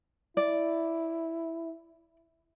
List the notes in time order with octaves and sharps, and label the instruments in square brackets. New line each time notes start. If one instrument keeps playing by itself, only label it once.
[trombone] E4 [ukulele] D5